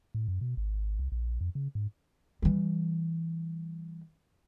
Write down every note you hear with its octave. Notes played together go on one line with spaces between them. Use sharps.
A2
F#2
B2
G#1
C2
A#1
F2
C#3
G#2
E3 G3